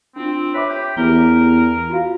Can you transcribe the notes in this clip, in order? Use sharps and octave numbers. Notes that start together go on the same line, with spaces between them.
C4 D4 F4
B4 C#5 E5 D6
G4
E2 G4 A#4 G7
F4 F#4 F5